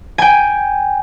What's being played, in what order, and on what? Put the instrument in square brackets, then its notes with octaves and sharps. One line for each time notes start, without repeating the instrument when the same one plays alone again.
[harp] G5 G#5